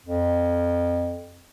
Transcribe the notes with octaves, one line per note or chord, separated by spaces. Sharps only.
F2